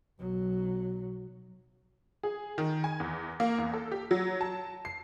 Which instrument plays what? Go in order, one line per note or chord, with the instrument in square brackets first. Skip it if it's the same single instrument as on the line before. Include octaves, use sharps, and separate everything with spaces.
[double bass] B1 F#3
[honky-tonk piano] G#4
D#3
G#5
E2
A#3
E2
A4
G4
F#3
A5
C7